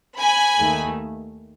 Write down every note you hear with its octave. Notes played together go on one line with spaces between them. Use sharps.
G#5 B5
D#2 D#3 A3